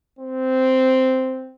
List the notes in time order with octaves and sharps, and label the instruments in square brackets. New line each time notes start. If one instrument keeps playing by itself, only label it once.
[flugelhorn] C4